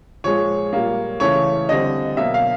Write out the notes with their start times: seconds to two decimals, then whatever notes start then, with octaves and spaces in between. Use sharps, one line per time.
0.24 A#2 F3 G#3 C#5
0.73 A#2 G3 A#3
1.20 C#3 E3 A3 C#4 C#5
1.69 D3 G3 C4 D#5
2.17 B2 F#3 A#3 E5
2.34 F5